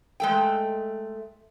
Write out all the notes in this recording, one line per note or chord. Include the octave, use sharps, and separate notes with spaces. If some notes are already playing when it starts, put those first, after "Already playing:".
G#3 A3 G5